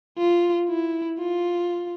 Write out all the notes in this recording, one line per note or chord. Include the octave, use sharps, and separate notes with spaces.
F4
E4
F4